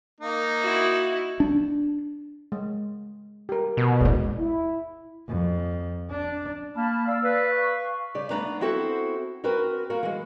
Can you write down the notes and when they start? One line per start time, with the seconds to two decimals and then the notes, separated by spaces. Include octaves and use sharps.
0.21 A#3 D#4
0.61 E4 F#4
1.40 D4
2.52 G#3
3.49 G4 A#4
3.77 B2
4.01 A1 D#2 G#3 G#4 D5
4.39 E4
5.28 F2
6.10 D4
6.76 A#3 A5 B5 F6
7.06 D5 F5 E6
7.24 B4
7.52 F5 C#6
8.15 C#3 D5
8.30 A3 B3 D4 B4 A#5
8.60 B3 C4 E4 F#4 A4 C5
9.44 C4 F#4 A#4 B4
9.90 A#3 F#4 A#4
10.03 E3 G#3